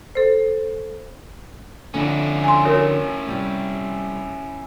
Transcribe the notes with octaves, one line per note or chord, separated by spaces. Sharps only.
A4 C5
F2 D3 C#4 E4
G#5 C6
F#4 A#4 C#5
C3 G3